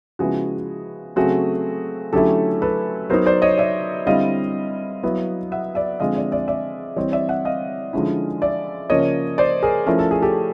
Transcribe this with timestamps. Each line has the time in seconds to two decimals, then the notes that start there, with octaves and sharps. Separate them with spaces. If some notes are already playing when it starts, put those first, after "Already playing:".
0.19 C#3 F3 G#3 B3 E4 F#4 G#4
1.16 C#3 F#3 A3 C4 F#4 G#4
2.13 D3 F#3 A3 C#4 E4 G4 A4
2.62 A4 B4
3.10 F#3 B3 D#4 A#4 C5
3.26 C5 D5
3.42 C#5 D#5
3.58 D5 E5
4.06 D3 G3 C4 E4 D#5 F5
5.03 F#3 B3 E4
5.52 E5 F#5
5.75 D5 E5
6.00 D3 F3 G#3 C4 D#5 F5
6.15 D5 E5
6.32 D5 E5
6.48 D5 E5
6.96 E3 G3 C4 C#5 D#5
7.12 D5 E5
7.29 E5 F#5
7.45 D#5 F5
7.93 D3 F3 G#3 C#4 E4
8.42 D5 E5
8.90 C#3 F3 A#3 C#5 D#5
9.38 C5 D5
9.62 G#4 A#4
9.86 F3 A3 C#4 E4 A#4
9.99 A4
10.11 G#4
10.22 G4 A4